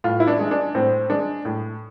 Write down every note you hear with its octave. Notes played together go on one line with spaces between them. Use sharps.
A2 F4
E4
D4
G#3
D4
A2 C4
G#3 D4
A2